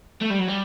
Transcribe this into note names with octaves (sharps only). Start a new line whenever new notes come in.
A3
G3
F#3
G3